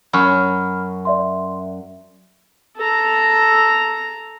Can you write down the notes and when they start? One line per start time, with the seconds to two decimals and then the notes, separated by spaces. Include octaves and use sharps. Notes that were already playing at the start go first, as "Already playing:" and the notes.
0.13 F#2 B5 C#6 F6
1.05 D5 E5 C6
2.77 A4 A#5